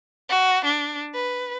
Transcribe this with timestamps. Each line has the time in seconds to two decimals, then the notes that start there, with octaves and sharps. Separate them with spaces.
0.29 F#4
0.64 D4
1.14 B4